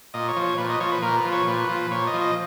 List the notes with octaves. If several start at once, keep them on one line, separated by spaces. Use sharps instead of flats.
A#2 D#5
C#5
F3
C#5
A#2 B4
D#5
F3 C#5
B4
A#2 A#4
B4
F3
C#5
A#2 B4
F3
A#2 C#5
D#5
F3
D#5